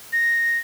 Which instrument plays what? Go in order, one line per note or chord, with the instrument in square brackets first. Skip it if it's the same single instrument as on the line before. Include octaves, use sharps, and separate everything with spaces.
[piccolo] A#6